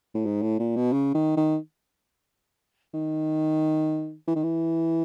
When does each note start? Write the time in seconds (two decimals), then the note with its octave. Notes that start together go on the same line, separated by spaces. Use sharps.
0.15 A2
0.26 G#2
0.42 A2
0.59 A#2
0.76 B2
0.93 C#3
1.14 D#3
1.37 D#3
2.94 D#3
4.27 E3
4.36 D#3
4.43 E3